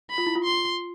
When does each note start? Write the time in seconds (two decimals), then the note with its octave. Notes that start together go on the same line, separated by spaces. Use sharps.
0.10 B5
0.18 F4
0.26 E4
0.36 F4
0.45 C6